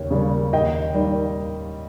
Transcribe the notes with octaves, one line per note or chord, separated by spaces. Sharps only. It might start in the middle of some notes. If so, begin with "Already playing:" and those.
Already playing: D#2 C#3 C#5
C#3 G3 A#3
D#2 D#5 G5
D#3 G3 A#3